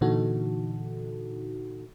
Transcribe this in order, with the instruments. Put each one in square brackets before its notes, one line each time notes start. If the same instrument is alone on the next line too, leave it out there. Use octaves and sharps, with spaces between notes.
[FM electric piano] A#2 D3 E3 D#4 F#4 A4